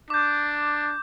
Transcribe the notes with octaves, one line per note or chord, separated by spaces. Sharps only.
D4 D6 G6